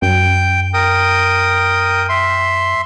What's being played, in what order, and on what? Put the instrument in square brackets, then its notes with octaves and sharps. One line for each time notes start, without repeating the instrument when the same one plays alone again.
[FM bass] F#2 [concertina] G5
[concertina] A#4 G5 D#6
E5 C6